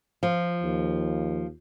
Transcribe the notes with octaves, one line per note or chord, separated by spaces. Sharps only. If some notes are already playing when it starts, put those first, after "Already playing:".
F3
D#2